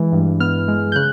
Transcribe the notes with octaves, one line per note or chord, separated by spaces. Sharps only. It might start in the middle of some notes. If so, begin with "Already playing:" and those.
Already playing: E3 G#3
G2
B3 F6
G#3
G6
C#3 F#6